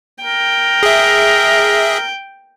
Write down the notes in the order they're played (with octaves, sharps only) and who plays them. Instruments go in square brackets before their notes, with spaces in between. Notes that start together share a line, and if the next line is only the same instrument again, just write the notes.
[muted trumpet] A#4 [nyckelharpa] G5
[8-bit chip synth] G#4 E5